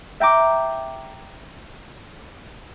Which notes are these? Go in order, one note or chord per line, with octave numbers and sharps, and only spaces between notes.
E5 G5 A#5 D6